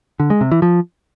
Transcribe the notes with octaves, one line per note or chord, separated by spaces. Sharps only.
D3
G#3
C3
E3
F3